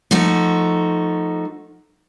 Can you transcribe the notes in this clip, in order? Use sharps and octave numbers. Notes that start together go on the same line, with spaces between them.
F3 A3 D#4 F#4